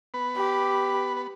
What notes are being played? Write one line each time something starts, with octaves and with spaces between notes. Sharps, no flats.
B3 B4
G4
B4